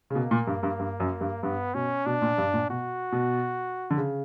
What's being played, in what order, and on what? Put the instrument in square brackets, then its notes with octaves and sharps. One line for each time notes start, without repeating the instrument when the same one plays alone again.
[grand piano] C#3
[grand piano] B2 [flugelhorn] A#3
[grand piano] A#2
G2
G2
G2
F#2
G2
[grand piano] G2 [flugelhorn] B3
[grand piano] B2 [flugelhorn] C#4
[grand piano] B2 [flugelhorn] D4
[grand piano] A#2
G2
A#2
[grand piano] B2 [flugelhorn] F#4
[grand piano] B2
D3
C#3